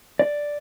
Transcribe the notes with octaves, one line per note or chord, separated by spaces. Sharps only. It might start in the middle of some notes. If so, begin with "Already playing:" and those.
D5